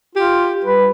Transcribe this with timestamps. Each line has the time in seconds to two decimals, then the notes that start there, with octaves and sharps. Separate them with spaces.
0.16 F4 G4
0.64 G3 B4